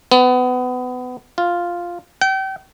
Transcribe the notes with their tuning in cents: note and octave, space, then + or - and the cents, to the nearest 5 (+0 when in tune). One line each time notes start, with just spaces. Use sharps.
B3 +25
F4 +0
G5 -35